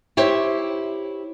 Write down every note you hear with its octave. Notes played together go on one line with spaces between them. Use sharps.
E4 G4 C5 C#5